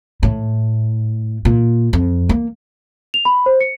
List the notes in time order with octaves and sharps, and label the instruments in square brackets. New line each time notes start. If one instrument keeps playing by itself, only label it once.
[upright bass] A2
A#2
F2
A#3
[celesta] F7
B5
C5
C#7